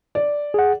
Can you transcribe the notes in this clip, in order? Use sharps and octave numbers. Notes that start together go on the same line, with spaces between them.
D5
G#4 F#5